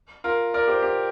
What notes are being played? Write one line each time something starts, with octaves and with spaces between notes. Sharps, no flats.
F4 A#4
A#4 D5
G4 C5
G4 C5